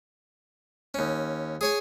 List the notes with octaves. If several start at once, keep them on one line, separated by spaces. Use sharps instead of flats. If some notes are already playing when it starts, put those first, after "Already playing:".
D#2 C#4
G#4 C#5 G#5